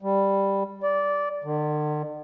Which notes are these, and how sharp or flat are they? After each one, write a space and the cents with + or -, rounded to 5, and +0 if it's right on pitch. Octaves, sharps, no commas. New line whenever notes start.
G3 +5
D5 -15
D3 +45